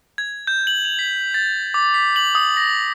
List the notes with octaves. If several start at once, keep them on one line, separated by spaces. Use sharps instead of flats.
G#6
G6
F#7
F7
B6
A6
D6
B6
F#7
D#6
A#6